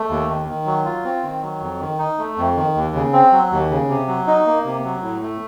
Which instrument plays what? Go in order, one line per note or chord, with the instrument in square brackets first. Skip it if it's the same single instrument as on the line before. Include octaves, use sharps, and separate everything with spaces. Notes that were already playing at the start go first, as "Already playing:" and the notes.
Already playing: [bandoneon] A3
D#2
D#3
D#3
F#3
F4
C4
D#3
F#3
F2
D#3
D#4
A3
F2
D#3
D#2
C#3
C4
F#3
D#2
C#3
C3
F#3
D#4
A#3
C3
F#3
A2
A3